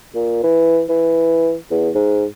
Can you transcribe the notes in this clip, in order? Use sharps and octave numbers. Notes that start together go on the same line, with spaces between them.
A#2
E3
E3
E2
G#2